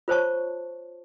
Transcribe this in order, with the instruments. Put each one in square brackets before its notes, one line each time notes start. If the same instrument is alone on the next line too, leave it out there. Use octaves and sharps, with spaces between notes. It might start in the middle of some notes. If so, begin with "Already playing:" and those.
[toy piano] F4 C5 C#5 A5 C#6